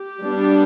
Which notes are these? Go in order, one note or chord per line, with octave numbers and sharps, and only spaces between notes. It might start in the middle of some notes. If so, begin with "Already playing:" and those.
Already playing: G4
G3 B3 D4